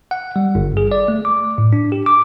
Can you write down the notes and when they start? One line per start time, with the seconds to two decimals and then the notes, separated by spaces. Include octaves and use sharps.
0.11 F#5
0.36 G3
0.55 G1
0.77 G#4
0.92 D5
1.08 A3
1.25 D6
1.58 A2
1.73 D4
1.92 G4
2.06 D6